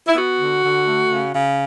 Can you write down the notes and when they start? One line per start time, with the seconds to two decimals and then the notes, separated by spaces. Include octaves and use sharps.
0.08 E4
0.15 B3 F#4
0.39 D3
0.63 D3
0.87 A3
1.11 C#3
1.34 C#3